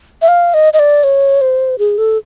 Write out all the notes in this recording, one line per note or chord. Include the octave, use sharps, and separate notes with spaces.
E5
F5
D#5
D#5
D5
C#5
C5
G#4
A4